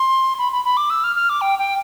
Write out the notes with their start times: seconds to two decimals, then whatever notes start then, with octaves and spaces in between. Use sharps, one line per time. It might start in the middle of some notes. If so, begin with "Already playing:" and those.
Already playing: C6
0.39 B5
0.52 B5
0.65 B5
0.77 D6
0.90 E6
1.04 F6
1.16 F6
1.29 D6
1.41 G5
1.59 G5